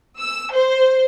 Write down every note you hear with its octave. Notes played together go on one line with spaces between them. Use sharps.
E6
C5